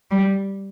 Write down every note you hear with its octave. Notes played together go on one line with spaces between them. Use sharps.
G3